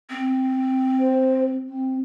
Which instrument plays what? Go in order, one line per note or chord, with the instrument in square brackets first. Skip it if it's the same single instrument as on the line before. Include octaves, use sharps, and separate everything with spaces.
[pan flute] C4
[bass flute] C5
C4